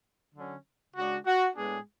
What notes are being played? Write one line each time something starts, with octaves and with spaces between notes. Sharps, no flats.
D3 F#3 C#4
C#3 G#3 D4 F#4
F#4
A2 G#3 B3 D4 G#4